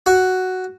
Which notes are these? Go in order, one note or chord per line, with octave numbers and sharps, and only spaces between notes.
F#4